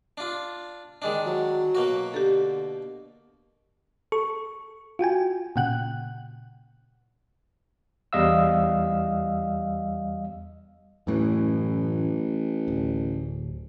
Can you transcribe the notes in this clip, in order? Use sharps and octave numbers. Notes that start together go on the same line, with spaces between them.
D4 F4
D#3 G#3 D4
F#3
B2 A#3 F#4
D3 G4 A4
A4 C#6
F4 F#4 G5 G#5
A#2 C#3 F#5 G5 F#6
E2 G3 D#5 F5 E6
A1 F#2 A2 E3
D1